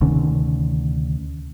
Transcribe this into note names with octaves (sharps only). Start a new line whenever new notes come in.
D2 C3 D#3 C#4